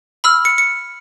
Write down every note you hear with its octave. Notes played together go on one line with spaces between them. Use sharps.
B5 E6 F6
C#7
C#7